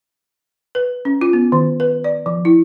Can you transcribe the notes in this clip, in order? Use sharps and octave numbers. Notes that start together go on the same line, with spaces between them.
B4
C#4
F4
B3
D#3
B4
D5
F3
E4